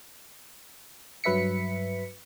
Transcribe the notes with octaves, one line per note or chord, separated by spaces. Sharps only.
G2 F#3 B4 E5 B6 C#7